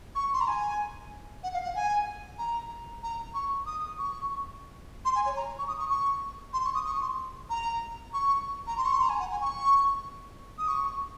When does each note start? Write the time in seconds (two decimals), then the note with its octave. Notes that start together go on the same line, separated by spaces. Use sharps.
0.15 C#6
0.33 C6
0.41 A#5
0.47 G#5
1.43 F#5
1.54 F5
1.64 F#5
1.75 G#5
2.38 A#5
3.03 A#5
3.34 C#6
3.66 D#6
3.98 C#6
5.05 C6
5.15 G#5
5.26 C#5
5.36 A#5
5.58 C#6
5.68 D#6
5.79 C#6
5.90 C#6
6.53 C6
6.65 C#6
6.75 D#6
6.86 C#6
7.01 C6
7.50 A#5
8.13 C#6
8.67 A#5
8.77 C6
8.85 C#6
8.92 C6
9.01 A#5
9.09 G#5
9.19 F#5
9.31 G#5
9.41 C#6
10.58 D#6
10.68 C#6